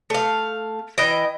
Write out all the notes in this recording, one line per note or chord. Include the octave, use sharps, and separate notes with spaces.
A3 F5
E3 D#5 G5